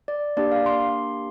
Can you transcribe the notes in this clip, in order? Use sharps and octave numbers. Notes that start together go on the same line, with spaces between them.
D5
A#3 D4 G4 D5
F5
C6